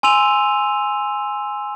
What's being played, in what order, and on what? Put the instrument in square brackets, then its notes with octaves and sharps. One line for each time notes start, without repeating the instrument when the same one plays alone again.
[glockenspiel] G#5 C6 E6 D#7 F7